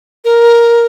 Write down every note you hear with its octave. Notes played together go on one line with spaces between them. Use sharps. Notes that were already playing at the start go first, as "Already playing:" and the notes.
A#4